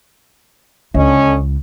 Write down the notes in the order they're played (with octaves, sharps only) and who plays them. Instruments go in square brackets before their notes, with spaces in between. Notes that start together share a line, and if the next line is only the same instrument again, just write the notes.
[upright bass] C#2 [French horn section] D3 C#4 D#5